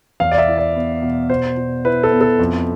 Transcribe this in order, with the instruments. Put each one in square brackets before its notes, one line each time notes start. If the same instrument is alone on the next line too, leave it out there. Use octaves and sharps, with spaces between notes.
[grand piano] E2 F5
D5
E5
E4
D5
B3
B2
B2 C5
B2
E4 B4
A4
B3
A4
F2